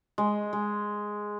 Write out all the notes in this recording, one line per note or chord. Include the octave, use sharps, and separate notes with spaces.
G#3
G#3